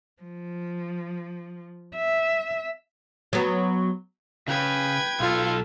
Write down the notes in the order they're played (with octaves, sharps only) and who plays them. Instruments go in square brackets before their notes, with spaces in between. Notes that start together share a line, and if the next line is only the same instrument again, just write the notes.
[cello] F3
E5
[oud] F#3 B3
[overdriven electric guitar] C#3 [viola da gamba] B4 [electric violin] G5 G#6
[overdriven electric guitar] B1 A4 [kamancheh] F4